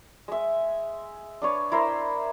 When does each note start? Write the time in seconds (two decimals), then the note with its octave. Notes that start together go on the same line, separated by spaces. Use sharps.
0.28 G#3 E5
1.42 D4 B4 C#5
1.72 E4 A#4 C5